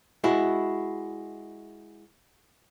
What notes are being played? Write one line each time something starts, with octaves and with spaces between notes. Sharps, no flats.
G#3 E4 F#4